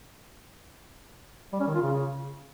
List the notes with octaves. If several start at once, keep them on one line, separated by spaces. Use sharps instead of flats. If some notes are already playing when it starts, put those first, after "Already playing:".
G3
C#4
D#3
F4
C#3